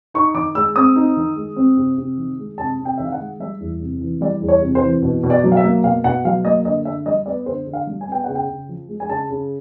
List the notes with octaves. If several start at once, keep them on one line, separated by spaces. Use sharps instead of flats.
D#4 C#6
D#3 D6
G#3 E6
C4 D#6
D#4
D#3
G#3
C4
C3
C3
D#3
G#3
C3 A5
C3
G5
D#3 E5
F5
F#5
G#3
G3 E5
E2
C3
E3
G3 D5
E2
C#5
C3
C5
E3
B2
B2
D5
F#3
F5
E5
A#3
B2 F5
B2 F#5
F#3 F5
A#3 D#5
D3 D#5
D3 E5
G3 D#5
B3 D5
D3 C5
D3
F5
G3
G#5
B3 G5
C#3 F#5
G5
C#3
F3
G#3
G#5
C#3 A5
C#3